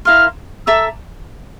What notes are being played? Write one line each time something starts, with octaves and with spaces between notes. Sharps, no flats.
E4 A#4 F5 C6 F6
A4 E5 A#5 D6 E6